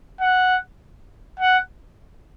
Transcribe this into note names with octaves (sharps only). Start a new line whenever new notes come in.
F#5
F#5